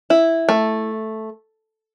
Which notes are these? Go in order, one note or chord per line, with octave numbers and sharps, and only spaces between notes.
E4
A3